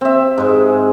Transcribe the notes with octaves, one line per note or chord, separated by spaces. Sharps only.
C4 E5
G#2 G#3